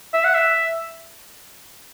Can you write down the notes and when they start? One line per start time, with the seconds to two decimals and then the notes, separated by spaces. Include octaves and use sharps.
0.13 E5
0.24 F#5
0.34 E5